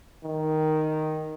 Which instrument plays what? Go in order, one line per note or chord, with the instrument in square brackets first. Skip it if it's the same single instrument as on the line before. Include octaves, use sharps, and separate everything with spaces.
[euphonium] D#3